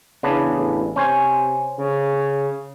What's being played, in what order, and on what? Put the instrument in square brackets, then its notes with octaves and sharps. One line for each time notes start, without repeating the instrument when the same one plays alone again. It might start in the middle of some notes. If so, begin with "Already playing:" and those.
[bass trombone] E2 [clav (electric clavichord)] C#3 B3 D4
[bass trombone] A1
[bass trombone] C3 [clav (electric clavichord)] C#4 C5 G#5
[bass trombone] C#3